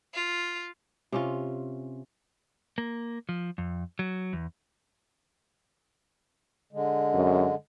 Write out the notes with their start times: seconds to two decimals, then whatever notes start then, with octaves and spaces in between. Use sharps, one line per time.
0.14 F4
1.12 C3 C#4 F4
2.78 A#3
3.29 F3
3.58 F2
3.99 F#3
4.33 E2
6.73 D3 G#3
7.14 F#2